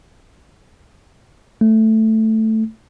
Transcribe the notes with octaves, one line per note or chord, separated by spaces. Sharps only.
A3